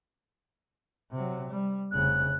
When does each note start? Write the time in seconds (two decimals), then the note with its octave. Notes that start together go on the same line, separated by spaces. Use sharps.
1.11 C3 F#3
1.49 G3
1.91 F1 C#3 F#6